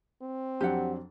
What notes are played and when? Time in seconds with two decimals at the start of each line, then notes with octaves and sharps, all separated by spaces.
0.21 C4
0.61 F2 F#3 D4 G4 F#5